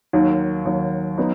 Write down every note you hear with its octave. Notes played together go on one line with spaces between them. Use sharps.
D#2 D#3 F#3
D#2 D#3 F#3
F#3 B3 D#4